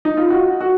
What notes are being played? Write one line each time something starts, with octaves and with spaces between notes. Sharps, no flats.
D#4
F4
F#4
F#4